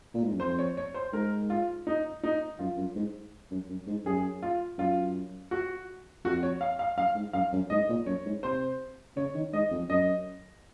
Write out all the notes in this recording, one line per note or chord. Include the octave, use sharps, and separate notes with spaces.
A#2
G#2
F#2
F2 C5
C#5
C#5
C5
G#2 A#4
F4
D#4
D#4
F#2 F4
F#2
G#2
F#2
F#2
G#2
F#2 G#4
F4
F#2 F4
F#4
F2 F#4
C#5
F5
F5
F#2 F5
G#2
F#2 F5
F#2
G#2 D#5
A#2
F#2 C#5
G#2
C3 C5
C#3 C#5
D#3
G#2 D#5
F2
F#2 D#5